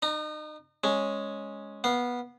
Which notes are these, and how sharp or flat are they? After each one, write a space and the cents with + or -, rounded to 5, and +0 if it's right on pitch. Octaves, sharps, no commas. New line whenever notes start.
D#4 -35 A#5 +0
G#3 +0 C#4 +0
B3 -15 F5 +0